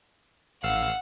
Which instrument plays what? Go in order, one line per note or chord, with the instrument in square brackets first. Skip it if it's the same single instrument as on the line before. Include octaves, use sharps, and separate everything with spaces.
[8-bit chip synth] A1 F5 E6 [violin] F#5